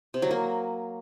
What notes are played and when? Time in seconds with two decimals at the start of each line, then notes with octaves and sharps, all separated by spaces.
0.14 C3
0.22 F#3
0.31 A#3